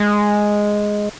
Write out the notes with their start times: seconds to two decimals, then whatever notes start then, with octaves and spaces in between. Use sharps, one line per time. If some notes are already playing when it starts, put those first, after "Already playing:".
Already playing: G#3